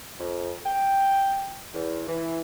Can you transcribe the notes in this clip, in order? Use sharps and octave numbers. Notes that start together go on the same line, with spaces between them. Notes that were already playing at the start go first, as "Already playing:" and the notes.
F2
G5
E2
E3